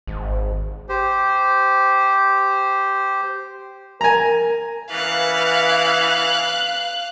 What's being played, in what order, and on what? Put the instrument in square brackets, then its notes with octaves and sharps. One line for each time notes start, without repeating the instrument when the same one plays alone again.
[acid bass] G#1
[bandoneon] G4 C5
[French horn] A#4 [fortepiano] G#5 A#5
[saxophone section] C#3 E3 B3 [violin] F5 F#6